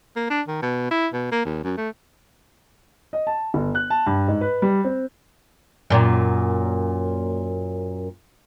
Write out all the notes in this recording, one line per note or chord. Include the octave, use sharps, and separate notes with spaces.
A#3
D4
D#3
B2
E4
B2
A#3
D#2
F#2
A3
D#5
A5
G1
F#6
A5
G2
G#2
B4
G3
C4
F#2 A#2